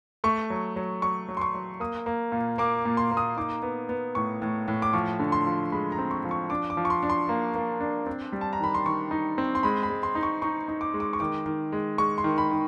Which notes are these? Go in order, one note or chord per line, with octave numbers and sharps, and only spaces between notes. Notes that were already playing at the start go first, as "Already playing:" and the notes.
A3 C#6
F#3
F#3
F#3 C#6
F#3
C6
C#6
F#3
A#3 D#6
A#3
A#2
A#3 D6
A#2
C6
A#3
D#6
D#4 D6
B3
B3
A2 C#6
A2
A2
D6
F3 C#6
D3
C6
F3
G#3 B5
A#5
C4
C#6
F3
C#6
D4 D6
D6
F3
C#6
C6
D4
C6
A#3
A#3
D4
C4
G3
A5
A#5
D#3 B5
C6
D#3 C#6
D#4
C4
C6
G#3 B5
B5
G#3
C6
D#4
C#6
D#4 C#6
D#4
D6
G#3
D6
C#6
D#3 D6
D#3
G#3
G#3 C#6
C6
D#3
B5
D#3